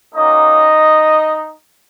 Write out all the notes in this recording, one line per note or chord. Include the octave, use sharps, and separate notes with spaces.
A#3 C#4 D#4 F#4 D#5